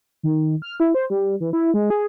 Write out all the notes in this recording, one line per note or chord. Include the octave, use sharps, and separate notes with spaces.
D#3
F6
E4
C5
G3
E3
E4
G#3
G#4